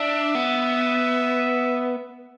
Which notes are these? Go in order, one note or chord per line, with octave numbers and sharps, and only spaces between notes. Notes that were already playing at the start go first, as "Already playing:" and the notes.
Already playing: D4 E5
B3